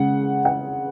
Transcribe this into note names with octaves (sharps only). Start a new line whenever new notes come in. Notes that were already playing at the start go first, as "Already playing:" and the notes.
Already playing: C#3 G#3 F#5
F#5